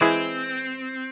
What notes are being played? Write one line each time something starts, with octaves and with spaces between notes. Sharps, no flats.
E3 G#3 C4 E4 G#4